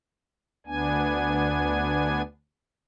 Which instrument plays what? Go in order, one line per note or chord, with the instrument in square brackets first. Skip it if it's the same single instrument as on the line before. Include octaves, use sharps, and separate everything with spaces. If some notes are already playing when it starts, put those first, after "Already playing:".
[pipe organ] D2 B3 D4 G#5